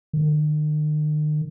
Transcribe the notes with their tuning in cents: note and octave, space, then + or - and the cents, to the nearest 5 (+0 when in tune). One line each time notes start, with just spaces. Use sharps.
D#3 -45